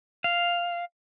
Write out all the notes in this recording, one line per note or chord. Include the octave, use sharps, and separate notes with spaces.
F5